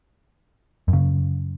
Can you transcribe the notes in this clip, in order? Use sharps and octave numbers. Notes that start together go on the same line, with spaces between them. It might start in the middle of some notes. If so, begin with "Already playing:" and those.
F#2
C#3